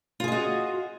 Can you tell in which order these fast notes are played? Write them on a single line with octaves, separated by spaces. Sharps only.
F4 G#4 D#5 F#4